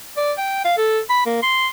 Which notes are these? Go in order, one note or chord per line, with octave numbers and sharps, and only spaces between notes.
D5
G5
F5
A4
B5
A#3
C6